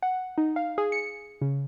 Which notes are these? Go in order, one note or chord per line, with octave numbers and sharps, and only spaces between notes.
F#5
D#4
F5
G#4
C#7
C#3